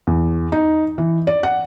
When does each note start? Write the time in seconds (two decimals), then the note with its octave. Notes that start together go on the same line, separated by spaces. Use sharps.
0.07 E2
0.52 D#4
0.98 E3
1.27 D5
1.43 F#5